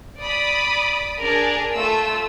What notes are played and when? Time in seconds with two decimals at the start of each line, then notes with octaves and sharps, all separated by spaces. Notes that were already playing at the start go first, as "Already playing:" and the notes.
0.20 D5 B5 D#6
1.20 D4 G#4 A#4 D5
1.73 A3 F4 E6